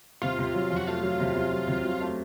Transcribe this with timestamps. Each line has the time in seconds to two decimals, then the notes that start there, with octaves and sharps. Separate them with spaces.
0.22 C3 F4
0.38 C3
0.54 F#3
0.71 F2
0.76 F#4
0.87 A3 F4
1.03 F#3
1.20 C3
1.35 C3
1.51 F#3
1.67 C3
1.84 F#3
2.01 A3